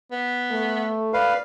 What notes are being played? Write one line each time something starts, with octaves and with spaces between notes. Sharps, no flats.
B3
A3
B4 D5 F5